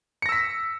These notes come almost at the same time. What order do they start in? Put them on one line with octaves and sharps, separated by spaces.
C#7 A#6 E6 B6